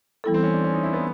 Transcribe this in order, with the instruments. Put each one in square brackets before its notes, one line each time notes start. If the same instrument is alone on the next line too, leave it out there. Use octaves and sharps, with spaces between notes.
[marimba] E3 G3 B3 E4 A4
[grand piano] C4
C#4
D4
C#4
D#4
E4
B3